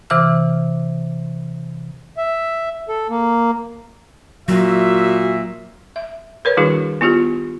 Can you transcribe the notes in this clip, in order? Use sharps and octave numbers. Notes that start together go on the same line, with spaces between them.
C3 E3 D6 F6
E5
A4
A#3
A#2 F#3 F#4 E5
E5
A#4 B4 C#5
D#3 G3 D4 E4 F#4 G#4
B3 E4 F4 G4